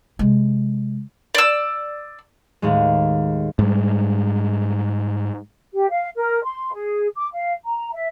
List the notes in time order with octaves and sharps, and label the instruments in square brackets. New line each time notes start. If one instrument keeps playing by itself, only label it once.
[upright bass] C3 G#3
[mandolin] D5 E6
[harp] D#2 A2 G#3
[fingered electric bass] G#2 G3
[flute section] G4
F5
A#4
C6
G#4
D6
F5
A#5
E5